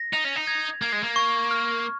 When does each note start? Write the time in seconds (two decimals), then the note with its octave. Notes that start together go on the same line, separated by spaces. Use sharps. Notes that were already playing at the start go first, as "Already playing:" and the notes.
Already playing: A#6
0.13 D#4 F7
0.25 C#4
0.36 D#4
0.47 G#6
0.82 A#3 G#6
0.92 G#3
1.03 A#3
1.16 C#6
1.51 F6